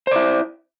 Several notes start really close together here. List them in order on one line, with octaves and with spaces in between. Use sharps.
C5 D5 E4